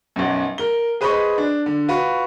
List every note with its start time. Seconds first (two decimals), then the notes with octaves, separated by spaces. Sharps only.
0.16 B1 F#2
0.58 A#4 G7
1.01 G#4 B4 C5 D#5 B5 C#6
1.38 D4
1.66 D3
1.88 F4 F#4 B4